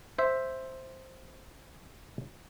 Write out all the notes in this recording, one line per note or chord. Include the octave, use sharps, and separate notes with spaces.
C5 E5